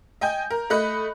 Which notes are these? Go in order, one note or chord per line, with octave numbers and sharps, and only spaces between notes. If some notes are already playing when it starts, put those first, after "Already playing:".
D#5 G5 G#5 G6
A#4
A3 D#5 B5 F#6